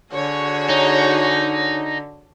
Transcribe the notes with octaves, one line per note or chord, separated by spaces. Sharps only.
D3 F#4 G#4 C#5
D#4